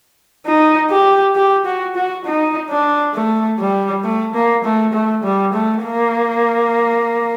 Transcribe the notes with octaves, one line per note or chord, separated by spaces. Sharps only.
D#4
G4
G4
F#4
F#4
D#4
D4
A3
G3
A3
A#3
A3
A3
G3
A3
A#3